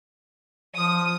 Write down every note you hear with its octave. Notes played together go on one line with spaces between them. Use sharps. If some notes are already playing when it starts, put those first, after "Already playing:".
F3 D#6